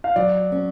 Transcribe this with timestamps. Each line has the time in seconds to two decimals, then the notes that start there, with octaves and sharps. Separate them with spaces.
0.04 F5
0.16 F#3 D5
0.52 C#4